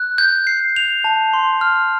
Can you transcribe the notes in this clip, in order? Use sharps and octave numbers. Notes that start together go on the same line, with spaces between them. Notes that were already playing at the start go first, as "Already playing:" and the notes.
Already playing: F#6
G6
C7
F7
A5
C6
F6